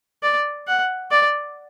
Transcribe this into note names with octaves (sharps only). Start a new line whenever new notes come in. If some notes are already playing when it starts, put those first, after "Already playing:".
D5
F#5
D5